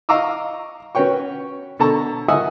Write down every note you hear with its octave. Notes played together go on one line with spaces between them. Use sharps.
D#5 F5 A#5 C#6 D6 E6
C#4 F#4 B4 C#5 G5 C#6
B2 D3 A4 A5 A#5 C#6
D#5 E5 F#5 G#5 D#6 E6